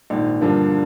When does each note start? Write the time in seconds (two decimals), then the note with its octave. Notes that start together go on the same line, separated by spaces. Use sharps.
0.10 A#1 G#2 D#3
0.41 G2 D3 F3 A#3 D4